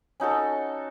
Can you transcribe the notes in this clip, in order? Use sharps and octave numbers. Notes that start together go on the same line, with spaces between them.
C#4 D#4 F#4 A4